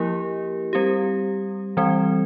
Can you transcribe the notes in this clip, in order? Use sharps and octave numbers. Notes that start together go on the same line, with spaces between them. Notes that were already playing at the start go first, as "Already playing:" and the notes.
Already playing: F3 A#3 E4 G4 A#4
G3 C4 G4
E3 G3 C4